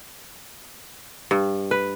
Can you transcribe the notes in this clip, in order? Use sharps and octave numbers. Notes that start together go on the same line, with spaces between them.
G2
B4